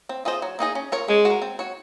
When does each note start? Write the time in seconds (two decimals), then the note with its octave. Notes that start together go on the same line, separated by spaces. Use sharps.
0.09 C4
0.25 F4 G#4 C5 D#5
0.42 F#3
0.59 A#3 D#4 G#4 D#5
0.75 C#4
0.92 F4 A#4 C#5
1.08 G#3 C#4
1.25 F#4
1.30 A#4
1.42 C4
1.59 F#4 C#5